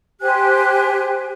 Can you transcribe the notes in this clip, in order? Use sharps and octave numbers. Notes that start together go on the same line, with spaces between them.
G4 C5 G#5 F#6